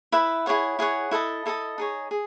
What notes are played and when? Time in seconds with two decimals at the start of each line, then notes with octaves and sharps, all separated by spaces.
0.12 E4 B4 E5 B5
0.46 E4 G#4 C#5 F#5
0.79 E4 G#4 C#5 F#5
1.11 E4 A4 D#5 A5
1.46 E4 A4 D#5 A5
1.78 D#4 G#4 C#5
2.11 G#4